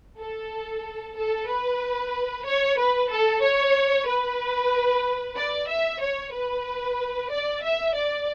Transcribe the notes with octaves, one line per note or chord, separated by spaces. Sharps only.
A4
A4
B4
C#5
B4
A4
C#5
B4
D5
E5
C#5
B4
D5
E5
D5